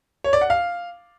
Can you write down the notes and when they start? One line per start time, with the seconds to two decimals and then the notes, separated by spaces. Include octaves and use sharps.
0.24 C#5
0.33 D5
0.41 F#5
0.50 F5